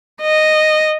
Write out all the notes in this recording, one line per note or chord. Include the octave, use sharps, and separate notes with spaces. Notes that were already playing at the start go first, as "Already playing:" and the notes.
D#5